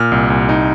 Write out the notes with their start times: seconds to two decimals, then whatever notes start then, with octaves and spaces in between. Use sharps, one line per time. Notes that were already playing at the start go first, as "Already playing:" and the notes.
Already playing: A#2 F6
0.12 C2
0.30 C2
0.49 D#4